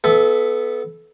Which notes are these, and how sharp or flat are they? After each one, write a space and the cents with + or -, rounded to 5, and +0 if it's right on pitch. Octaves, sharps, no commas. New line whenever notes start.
B3 +0 A4 -25 E5 +0